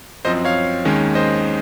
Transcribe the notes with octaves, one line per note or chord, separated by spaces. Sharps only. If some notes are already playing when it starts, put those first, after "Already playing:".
F#2 F3 C4 C5 D#5
C#5 F5
D#2 D#3 G#3 C#4
C5 D#5